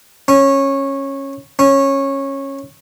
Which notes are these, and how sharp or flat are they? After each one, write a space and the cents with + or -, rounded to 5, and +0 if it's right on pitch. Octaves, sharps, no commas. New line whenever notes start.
C#4 -15
C#4 -15